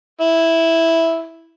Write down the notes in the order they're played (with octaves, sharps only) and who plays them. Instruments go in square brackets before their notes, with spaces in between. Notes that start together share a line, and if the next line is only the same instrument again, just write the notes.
[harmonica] E4